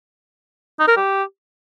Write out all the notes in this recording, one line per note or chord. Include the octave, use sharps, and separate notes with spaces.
D#4
A#4
G4